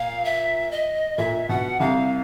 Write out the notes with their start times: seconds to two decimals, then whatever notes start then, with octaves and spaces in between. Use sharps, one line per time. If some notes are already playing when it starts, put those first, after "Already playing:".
Already playing: A#2 F5
0.25 E5
0.71 D#5
1.18 A#2 E5
1.49 B2 F#5
1.80 C2 C3 F5